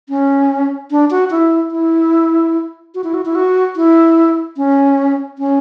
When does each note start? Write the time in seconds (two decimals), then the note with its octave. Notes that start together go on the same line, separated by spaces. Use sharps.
0.09 C#4
0.91 D4
1.11 F#4
1.31 E4
1.71 E4
2.95 F#4
3.04 E4
3.14 F#4
3.25 E4
3.35 F#4
3.76 E4
4.57 C#4
5.38 C#4